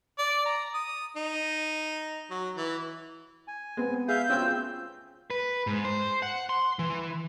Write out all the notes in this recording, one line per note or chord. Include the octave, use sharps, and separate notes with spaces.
D5
A#5
D#6
D#4
F#3
E3
G#5
G#3 B3 C4
G#4 E5 F5 G6
D2 C4 C#4 F4 G#5 E6
B4
G#2
C5
F#5
C6
E3